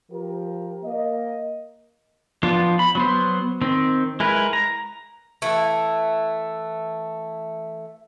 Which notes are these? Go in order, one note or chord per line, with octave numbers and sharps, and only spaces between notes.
F3 G4 A#4
A#3 D#5
F3 B3 D4 F4
B5
F#3 B3 C5
D#3 C4
G#3 E4 A#4 B4
A#5
E3 A3